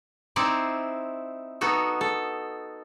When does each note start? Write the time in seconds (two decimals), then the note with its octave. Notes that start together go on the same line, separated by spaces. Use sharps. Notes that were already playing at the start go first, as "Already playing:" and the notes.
0.36 C4 D#4 E4 C5 D5
1.61 B3 D#4 F#4 A4
2.01 A4